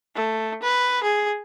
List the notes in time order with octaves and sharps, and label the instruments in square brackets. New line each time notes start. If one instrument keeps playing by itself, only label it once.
[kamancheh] A3
B4
G#4